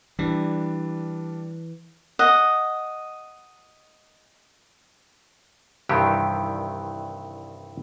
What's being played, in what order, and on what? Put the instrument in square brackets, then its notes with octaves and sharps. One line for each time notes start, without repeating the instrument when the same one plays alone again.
[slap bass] E3 [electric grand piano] G3 D4
[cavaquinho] D#5 F#5
[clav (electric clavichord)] C2 G2 C3 D#3 E3 G4